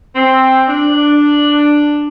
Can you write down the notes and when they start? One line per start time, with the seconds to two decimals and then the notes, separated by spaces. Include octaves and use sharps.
0.15 C4
0.67 D4